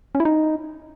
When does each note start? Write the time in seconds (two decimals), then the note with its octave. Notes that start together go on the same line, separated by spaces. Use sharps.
0.15 C#4
0.20 E4
0.25 D#4